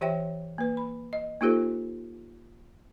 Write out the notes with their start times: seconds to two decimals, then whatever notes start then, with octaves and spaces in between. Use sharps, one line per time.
0.01 E3 G4 C5 C#5 E5 G5
0.58 A#3 B4
0.77 B5
1.13 D#5
1.41 A#3 D#4 F4 G4 A4 C5